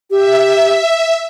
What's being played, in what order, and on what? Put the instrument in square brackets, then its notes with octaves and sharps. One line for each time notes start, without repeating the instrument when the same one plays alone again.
[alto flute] G4 [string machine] E5